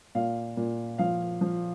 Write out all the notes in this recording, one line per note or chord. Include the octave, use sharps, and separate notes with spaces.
A#2 F5
A#2
F3 F5
F3